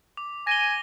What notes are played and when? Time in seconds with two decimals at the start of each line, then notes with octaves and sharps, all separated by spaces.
0.17 D6
0.47 G#5 A#6 D#7 G7